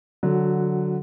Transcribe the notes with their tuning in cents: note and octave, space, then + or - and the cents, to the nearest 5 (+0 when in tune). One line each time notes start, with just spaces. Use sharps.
D3 +0 F#3 +0 F#4 -35